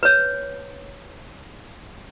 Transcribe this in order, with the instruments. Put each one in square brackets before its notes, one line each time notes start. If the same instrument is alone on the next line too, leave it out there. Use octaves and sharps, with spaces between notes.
[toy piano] B4 C#5